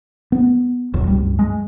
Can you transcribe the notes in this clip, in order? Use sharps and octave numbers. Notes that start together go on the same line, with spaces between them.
B3
D#1 B1 F#2 B2
C#2 G2 G3
G#3